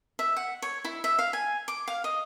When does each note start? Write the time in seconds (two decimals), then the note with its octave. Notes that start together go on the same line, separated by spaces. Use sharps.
0.19 E5
0.36 F#5
0.62 C#5
0.84 E4
1.04 E5
1.19 F5
1.33 G#5
1.68 D6
1.88 F5
2.04 D#5